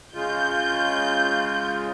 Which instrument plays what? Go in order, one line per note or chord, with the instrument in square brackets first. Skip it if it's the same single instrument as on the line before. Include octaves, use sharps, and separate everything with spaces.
[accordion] C#3 G#3 F4 [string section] G6